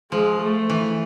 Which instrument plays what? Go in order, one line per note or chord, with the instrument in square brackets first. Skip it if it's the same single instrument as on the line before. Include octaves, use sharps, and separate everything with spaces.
[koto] F3 [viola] G#3
[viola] A3
[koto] E3